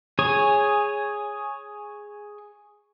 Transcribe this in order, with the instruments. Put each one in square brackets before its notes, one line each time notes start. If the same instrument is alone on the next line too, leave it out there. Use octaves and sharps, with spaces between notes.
[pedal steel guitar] G#4 C#5 G#5